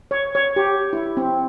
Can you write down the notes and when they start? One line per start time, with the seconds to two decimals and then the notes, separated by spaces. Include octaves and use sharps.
0.11 C#5
0.35 C#5
0.56 G4
0.93 E4
1.17 C4